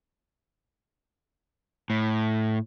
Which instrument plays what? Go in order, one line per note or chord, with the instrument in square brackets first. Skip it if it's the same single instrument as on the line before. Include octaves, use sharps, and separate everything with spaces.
[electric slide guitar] A2